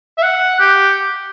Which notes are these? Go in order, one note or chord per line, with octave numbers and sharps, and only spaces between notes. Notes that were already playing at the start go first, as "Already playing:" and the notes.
E5
F#5
G4